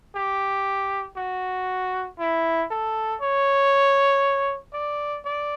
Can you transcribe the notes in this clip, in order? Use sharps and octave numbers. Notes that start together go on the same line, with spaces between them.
G4
F#4
E4
A4
C#5
D5
D5